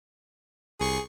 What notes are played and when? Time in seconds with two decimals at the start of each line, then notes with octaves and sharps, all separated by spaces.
0.80 C2 G#4 C#6 C7